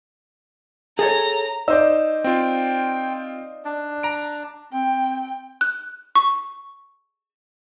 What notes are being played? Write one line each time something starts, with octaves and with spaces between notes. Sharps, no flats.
G#4 A4 C#5 A#5
D#4 C5 D5 E6
C4 F4 G5
D4
A#5 D7
C4 G5
F#6
C#6